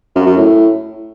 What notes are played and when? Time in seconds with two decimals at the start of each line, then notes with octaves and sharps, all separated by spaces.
0.15 F#2
0.26 F#2
0.36 A2